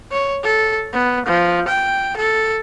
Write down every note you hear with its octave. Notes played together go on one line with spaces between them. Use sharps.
C#5
A4
B3
F3
G5
A4